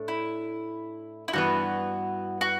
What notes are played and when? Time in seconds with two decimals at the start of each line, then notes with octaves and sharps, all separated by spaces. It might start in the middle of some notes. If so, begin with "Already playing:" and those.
Already playing: A2 A3 D4
0.08 E4
1.28 E4
1.33 G2 E3 B3 F#4
2.41 F#4